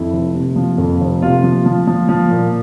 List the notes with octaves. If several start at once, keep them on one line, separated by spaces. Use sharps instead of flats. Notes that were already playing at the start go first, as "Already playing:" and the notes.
Already playing: F2 E4
F1
C3
F3
F2
F1
C3 F4
F3
F3
F3
F3
A#2